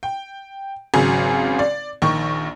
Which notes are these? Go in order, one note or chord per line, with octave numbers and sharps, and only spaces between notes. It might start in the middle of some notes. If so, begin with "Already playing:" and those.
G5
G#1 C#3 F#3 G#5
D5
A#1 D#3 C#6